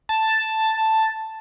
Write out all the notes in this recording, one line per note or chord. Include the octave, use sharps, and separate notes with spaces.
A5